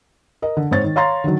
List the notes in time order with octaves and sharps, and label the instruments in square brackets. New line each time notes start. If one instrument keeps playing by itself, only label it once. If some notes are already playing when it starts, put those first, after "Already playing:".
[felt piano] A#4 D#5
D3
G#2 C4 C#5 A6
D#3
C#5 F5 A#5 C6 A6
D3 D#3 F#3